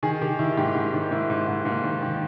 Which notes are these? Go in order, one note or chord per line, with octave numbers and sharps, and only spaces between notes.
D#3 G#4
D#3 G4
D#3 E4
G#2 G4
G#2
D#3
G#2 E4
G#2
G#2
G#2 A#3
D#3
D#3